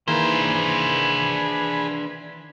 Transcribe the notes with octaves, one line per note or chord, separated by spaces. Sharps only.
D#3 E3 A#3 D4 G#4 B4 C5